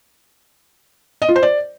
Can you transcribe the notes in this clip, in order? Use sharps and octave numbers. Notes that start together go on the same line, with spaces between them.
D#5
F4
C5
D5